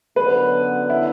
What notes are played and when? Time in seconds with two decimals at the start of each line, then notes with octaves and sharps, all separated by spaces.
0.16 F#2 D3 F#3 B3 B4
0.90 E4